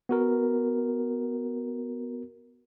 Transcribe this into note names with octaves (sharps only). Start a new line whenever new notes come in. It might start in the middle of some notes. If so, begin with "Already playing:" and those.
B3 F#4 A#4